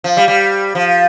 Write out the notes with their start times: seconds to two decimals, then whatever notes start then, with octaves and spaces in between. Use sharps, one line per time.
0.04 F3
0.17 G3
0.28 G3
0.75 F3